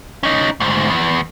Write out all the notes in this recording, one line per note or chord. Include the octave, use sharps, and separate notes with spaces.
C#4 D#4
D2 G#2
E2